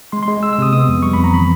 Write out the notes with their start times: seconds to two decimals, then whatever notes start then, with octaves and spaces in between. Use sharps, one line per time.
0.12 G#3 C6
0.23 C6
0.28 G#3
0.43 G#3 E6
0.53 E6
0.58 C3 D#6
0.73 B3 D#6
0.89 F2
1.03 G3 C#6
1.13 F2 B5
1.24 A#5
1.34 E3 B5